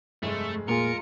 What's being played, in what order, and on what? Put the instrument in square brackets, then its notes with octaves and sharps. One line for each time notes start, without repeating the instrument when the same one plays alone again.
[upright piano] F1 G#3 [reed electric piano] G2 [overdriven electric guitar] A3
[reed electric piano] A#2 A#3 G#4 [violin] F4 C#7 [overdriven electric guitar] A#4